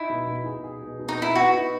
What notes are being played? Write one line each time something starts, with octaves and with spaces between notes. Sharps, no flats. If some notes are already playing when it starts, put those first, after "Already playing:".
Already playing: D#4 E4
B2
B2
G#4
G#4
B2
B2
D#4
B2 E4
B3 F#4
D#4